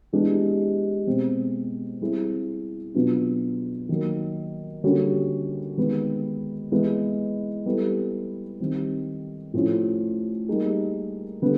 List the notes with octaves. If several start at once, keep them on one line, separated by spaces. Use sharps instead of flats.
E3 G#3 B3 D4 G4
B2 G#3 C4
G3 C4 E4 G#4
B2 F#3 B3 D4 F4
D#3 F#3 A#3
D3 G3 A#3 C#4 F#4
D#3 G#3 B3
E3 G#3 B3 E4
G3 B3 E4 A4
D#3 G3 C4
A2 F3 A3 C#4
G3 A#3 D#4 G#4
D3 G3 B3